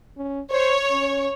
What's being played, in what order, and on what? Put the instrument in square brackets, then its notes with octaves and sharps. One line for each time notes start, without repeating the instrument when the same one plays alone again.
[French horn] C#4
[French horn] C5 [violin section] C#5
[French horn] C#4